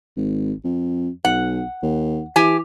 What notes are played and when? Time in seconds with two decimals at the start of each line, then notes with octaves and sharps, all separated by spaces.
0.16 G#1
0.64 F2
1.25 B1 F#5
1.83 D#2
2.36 E3 G4 G#5